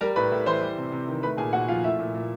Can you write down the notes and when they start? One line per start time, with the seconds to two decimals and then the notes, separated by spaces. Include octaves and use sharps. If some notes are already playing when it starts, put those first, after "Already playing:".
0.01 G3 A#4 A#5
0.16 A2 B4 B5
0.32 A2
0.46 E3 C5 C6
0.61 G3
0.77 C3
0.92 C3
1.08 D#3
1.23 A3 B4 B5
1.37 A#2 G#4 G#5
1.53 A#2 F#4 F#5
1.68 F3 F4 F5
1.84 A3 E4 E5
1.99 A#2
2.14 A#2